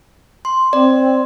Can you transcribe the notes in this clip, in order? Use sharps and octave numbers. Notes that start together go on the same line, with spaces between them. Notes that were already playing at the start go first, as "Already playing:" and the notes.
C6
C4 D5